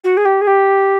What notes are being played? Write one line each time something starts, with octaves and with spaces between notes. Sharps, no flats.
F#4
G#4
G4
G#4
G4